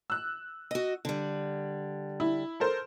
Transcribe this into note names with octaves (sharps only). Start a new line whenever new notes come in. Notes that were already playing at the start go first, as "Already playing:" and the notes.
E6 F#6
F#4 D#5
D3 G3
E4
A4 A#4 C5